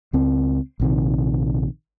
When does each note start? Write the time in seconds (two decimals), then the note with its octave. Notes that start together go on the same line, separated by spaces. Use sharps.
0.13 C#2 C4
0.80 A#1 C3 D#3